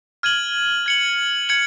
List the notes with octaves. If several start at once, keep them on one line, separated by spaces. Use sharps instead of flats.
F6 G#6 D#7 F#7
G#6 C#7 F#7
G#6 C#7 F#7